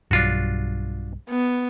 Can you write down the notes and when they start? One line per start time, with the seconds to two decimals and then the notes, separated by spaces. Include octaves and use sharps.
0.11 B1 G2 D4 F4 F#4
1.30 B3